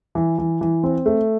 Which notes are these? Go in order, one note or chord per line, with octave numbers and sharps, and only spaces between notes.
E3
E3
E3
C4
A3